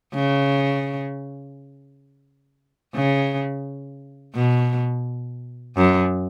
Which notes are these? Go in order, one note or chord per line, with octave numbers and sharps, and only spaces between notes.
C#3
C#3
B2
F#2